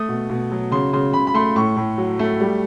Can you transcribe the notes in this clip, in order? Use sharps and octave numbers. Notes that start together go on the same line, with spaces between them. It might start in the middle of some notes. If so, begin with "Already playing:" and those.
Already playing: A3 D#6
B2
B2
F#3
C#3 C6
C#3 C6
C#3 B5
B5
A3 C6
A2 C#6
A2
F#3
A3
G3